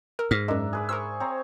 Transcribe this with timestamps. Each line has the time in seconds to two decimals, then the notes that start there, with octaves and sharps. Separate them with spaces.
0.19 A#4 E6
0.31 G#2 F6
0.48 F#2 G#3 D4 A#4 E5
0.73 G#4 B4 D6
0.89 A#4 C5 G#5 C#6 E6
1.20 C4 C#5 A#5